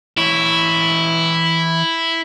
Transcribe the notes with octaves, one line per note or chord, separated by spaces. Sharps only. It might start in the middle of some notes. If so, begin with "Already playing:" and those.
E3 E4 C#5